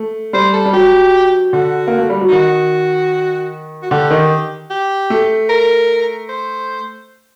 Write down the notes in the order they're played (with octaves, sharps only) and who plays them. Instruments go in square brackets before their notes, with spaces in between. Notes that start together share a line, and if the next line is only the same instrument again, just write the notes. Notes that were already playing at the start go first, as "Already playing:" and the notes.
Already playing: [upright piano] A3
[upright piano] G3 [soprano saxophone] C5
[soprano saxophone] A4
[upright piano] G3
[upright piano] F#3 [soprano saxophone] G4
[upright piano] D3 [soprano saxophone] F#4
[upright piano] A#3
A3
G3
F#3
[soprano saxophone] D#4
[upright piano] D#3 [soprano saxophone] F#4
[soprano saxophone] F#4
[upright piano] D3 [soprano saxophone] G4
[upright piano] D#3
[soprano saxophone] G4
[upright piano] A3
[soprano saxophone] A#4
C5